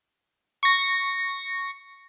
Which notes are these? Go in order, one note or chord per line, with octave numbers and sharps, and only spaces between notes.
C#6 A#6